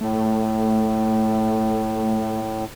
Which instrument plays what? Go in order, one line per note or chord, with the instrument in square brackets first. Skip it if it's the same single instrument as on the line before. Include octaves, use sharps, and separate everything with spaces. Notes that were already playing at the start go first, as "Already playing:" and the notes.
[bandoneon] A2 [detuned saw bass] A3